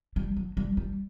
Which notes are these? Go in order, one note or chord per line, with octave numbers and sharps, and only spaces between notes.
G3
F#3
G3
G3